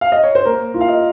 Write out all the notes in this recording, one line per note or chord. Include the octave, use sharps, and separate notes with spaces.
F5
D#5
C#5
C5
A#3 A#4
F4
F5
D#5